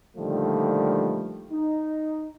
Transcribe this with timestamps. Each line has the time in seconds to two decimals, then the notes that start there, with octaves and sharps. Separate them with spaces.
0.16 A#2 D3 D#3 F3 G3 A3
1.52 D#4